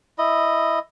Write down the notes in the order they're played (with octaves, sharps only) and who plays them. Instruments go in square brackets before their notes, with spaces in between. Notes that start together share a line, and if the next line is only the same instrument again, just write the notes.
[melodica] E4 D#5